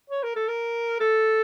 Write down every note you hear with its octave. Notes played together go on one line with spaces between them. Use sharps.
C#5
A#4
A4
A#4
A4